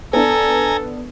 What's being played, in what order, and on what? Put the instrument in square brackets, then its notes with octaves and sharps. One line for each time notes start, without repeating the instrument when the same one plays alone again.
[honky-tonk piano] B3 D4 [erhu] A4 [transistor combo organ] G#5 A#5